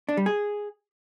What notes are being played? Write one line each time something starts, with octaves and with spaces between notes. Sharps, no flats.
D4
G3
G#4